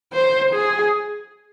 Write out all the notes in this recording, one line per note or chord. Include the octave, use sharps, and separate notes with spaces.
C5
G#4